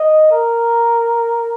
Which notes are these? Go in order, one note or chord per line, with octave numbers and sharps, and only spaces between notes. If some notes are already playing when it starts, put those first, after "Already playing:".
Already playing: D#5
A#4